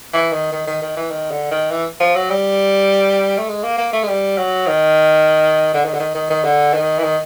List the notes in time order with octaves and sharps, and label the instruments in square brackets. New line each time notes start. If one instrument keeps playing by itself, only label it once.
[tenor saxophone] E3
D#3
D#3
D#3
D#3
E3
D#3
D3
D#3
E3
F3
F#3
G3
A3
G#3
A#3
A#3
A3
G#3
G3
F#3
D#3
D3
D#3
D3
D#3
D#3
D#3
D3
D#3
E3
D#3